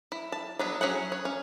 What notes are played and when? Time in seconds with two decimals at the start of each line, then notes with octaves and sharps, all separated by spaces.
0.12 E4
0.32 A5
0.59 F#3 B3 D4
0.81 F#3 C#4 G#4 F#5
1.12 C#5
1.25 C#4